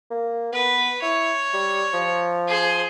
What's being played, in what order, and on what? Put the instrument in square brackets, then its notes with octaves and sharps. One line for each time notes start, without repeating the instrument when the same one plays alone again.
[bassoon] A#3
[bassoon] B3 [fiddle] B4
[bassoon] E4 [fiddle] C#5
[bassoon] G3
F3
[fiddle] G#4 C5